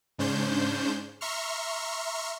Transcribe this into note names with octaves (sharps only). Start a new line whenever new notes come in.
G#2 C#3 C#4 D4 C5 G6
E5 A#5 C6 C#6 F6